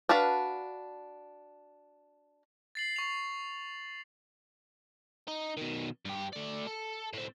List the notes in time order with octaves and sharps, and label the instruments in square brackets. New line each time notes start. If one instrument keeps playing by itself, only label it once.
[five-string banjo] D4 F#4 B4 F5 A5
[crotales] A6 C7 F#7
C#6 F7
[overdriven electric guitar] D#4
B2 D#3
G2 G4
A3 D5
A4
A2 C4